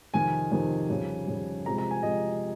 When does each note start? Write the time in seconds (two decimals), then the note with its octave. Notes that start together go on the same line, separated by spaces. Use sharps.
0.14 F2 C3 D#3 G#5
0.52 F2 C3 D#3
0.90 F2 C#3 G3
1.28 F2 C#3 G3
1.65 C3 F3 G#3 C4 A#5
1.78 A#5
1.91 G#5
2.03 C3 F3 G#3 C4 D#5